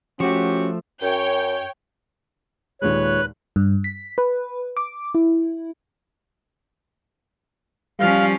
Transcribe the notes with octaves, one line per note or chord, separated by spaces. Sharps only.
F3 A3 C#4 F#4 G4
F#2 C#5 G5 G6
D#2 A#2 G#3 B4 C#5 F#6
G2
B6
B4
D6
E4
F3 G3 C#4 F5